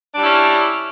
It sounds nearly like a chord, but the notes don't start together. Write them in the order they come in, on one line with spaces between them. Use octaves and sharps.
D4 G3 E4 C#4